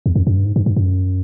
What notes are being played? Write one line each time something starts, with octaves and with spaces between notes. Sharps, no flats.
E2
F2
F#2
G2
G#2
G2
G2
F#2